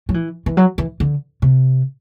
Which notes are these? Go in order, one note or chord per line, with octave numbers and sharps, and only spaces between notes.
F#3
E3
E3
F#3
E3
D3
C3